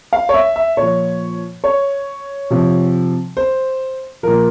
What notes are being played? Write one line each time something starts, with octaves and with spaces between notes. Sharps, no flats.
F5
C#5
E5
E5
A#2 F3 C#5
C#5
C3 F3
C5
A#2 F3 A#4